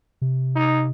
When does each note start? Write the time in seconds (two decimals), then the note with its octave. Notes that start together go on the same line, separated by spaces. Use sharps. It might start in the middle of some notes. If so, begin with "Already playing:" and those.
0.22 C3
0.56 D#4